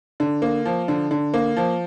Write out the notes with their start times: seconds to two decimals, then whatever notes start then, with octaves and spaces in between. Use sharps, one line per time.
0.20 D3
0.42 A#3
0.65 F3
0.88 D3
1.11 D3
1.34 A#3
1.57 F3